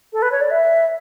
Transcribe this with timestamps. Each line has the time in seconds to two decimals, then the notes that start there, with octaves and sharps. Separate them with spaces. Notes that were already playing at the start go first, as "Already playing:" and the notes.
0.13 A4
0.22 B4
0.32 C#5
0.41 D5
0.51 E5